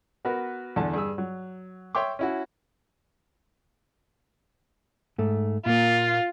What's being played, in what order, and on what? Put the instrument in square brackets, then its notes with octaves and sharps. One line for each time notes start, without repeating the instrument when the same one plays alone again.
[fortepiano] B3 F#4 A#4 B4
E2 D3 A5
G2 G#4 E6
F#3
C#5 E5 G5 C6 D6
C#4 E4 F#4
[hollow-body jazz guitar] G#2 A3
[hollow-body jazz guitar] A#2 A#3 [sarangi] F4